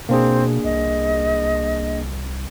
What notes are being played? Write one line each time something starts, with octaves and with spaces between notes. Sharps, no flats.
B2 A#3 C4 D4 G#4
C2 D#5